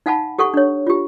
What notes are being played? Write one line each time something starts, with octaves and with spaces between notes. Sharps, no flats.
D#4 F5 F#5 G#5 A5 B5
G4 A4 F#5 C#6
D4 C#5
F4 G4